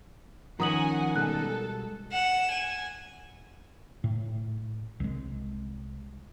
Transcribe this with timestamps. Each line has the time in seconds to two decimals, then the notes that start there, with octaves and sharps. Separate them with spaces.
0.60 D#3 F3 C#4 F#5 G#5 A#5 D#6 F#7
1.16 B2 G3 G#3 A4 F#6
2.13 F#5 E7
2.52 G#5
4.04 A2
5.00 C2 G#3